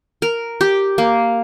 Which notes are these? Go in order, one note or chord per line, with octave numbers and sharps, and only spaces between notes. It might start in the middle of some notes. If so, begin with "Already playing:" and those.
A#4
G4
A#3